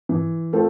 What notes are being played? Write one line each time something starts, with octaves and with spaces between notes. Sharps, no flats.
E3
A3 C4 F4 A4